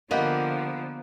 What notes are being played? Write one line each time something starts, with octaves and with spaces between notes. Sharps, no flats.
D3 F3 A#3 B3 G4 A#4 D#5